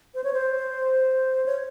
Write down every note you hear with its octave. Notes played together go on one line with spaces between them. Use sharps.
C5
C#5
C5
C#5